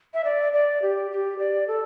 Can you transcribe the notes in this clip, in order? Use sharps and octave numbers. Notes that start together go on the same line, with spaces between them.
E5
D5
D5
G4
G4
D5
A4